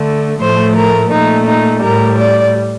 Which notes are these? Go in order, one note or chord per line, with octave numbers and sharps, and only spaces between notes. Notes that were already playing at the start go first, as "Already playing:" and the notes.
Already playing: D3 A3
A2 F3 A3 C5
A#4
A#2 A3 D#4
D#4
A2 G3 A#4
D5